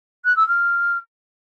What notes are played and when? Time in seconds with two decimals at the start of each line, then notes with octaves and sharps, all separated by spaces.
0.24 F#6
0.36 E6
0.48 F6